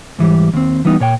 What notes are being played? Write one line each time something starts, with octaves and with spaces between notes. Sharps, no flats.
G#2 E3 G3
D#2 C4
E3 G3 B3 D#4
A#2 C#5 G5